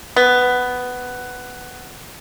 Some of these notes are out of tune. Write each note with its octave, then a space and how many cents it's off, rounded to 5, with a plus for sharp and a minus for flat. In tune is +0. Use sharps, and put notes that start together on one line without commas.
B3 +10